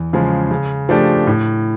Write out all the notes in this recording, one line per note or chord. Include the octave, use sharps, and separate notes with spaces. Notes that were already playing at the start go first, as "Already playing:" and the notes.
Already playing: E2
C#3 F3 G#3
C#3
F3 A3 D4 G4
A2